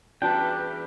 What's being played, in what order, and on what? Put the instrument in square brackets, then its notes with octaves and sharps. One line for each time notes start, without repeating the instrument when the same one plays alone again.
[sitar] E2 G3 B4 [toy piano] C#4 F#4 A5 [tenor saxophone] D4 [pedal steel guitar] G5